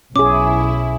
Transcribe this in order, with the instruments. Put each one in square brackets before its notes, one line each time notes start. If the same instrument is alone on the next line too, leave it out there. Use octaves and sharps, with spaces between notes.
[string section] B1 E4 [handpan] C#4 G#4 [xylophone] D6